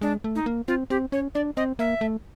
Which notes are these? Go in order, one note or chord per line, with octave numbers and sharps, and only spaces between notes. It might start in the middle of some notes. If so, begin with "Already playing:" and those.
G#3 D4
A3
D#4
A#3
C4 F4
C4 G4
C#4 C#5
D4 D5
C4 D#5
A#3 E5
A3